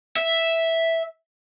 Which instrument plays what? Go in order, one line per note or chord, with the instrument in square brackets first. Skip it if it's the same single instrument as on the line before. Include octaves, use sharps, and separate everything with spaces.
[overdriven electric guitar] E5